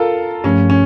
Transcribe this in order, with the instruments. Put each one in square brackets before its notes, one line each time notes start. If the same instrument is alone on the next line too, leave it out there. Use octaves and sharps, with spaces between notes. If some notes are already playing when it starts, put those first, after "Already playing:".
Already playing: [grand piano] F4 A4 A#4
[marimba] G2 F3 A3 [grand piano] C#4
[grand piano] C#4